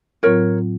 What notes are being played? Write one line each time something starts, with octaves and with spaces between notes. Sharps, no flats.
A2 F#3 C4 F4 A#4 C#5